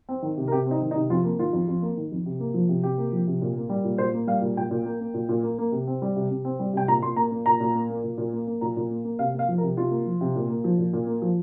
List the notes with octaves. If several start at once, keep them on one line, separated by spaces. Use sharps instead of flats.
C4
D#3
C3
A#4
C3 G4
C4 D#4
D#3
D#4
C3
F2 F4
A#3
D#3 F4
F2
F2
A#3
D#3
F2
C3
A#3
F3
C3
C3 G4
A#3
F3
C3
A#2
A#3
G3
A#2
A#2 C5
A#3
G3 F5
A#2
A#2 G5
A#2
A#3
A#3
A#2
A#2
A#3
A#3
C3
C4
G3
C3
C3
C4
G3
C3 G5
A#2 A#5
A#2 C6
A#3 A#5
A#3
A#2 A#5
A#2
A#3
A#3
A#2
A#2
A#3
A#3
A#2 A#5
A#2
A#3
A#3
C3 F5
A#3 F5
F3
A#4
C3
C3 F4
A#3
F3
C3
A#2
A#3
F3
A#2
A#2
A#3
F3